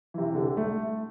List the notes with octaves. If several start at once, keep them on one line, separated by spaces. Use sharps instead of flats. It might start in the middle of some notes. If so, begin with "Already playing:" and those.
C3 E3
D3
A3